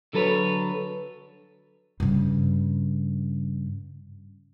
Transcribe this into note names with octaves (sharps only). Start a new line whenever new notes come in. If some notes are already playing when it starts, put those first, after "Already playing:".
D3 F#3 A4 B4 C#5
G2 C#3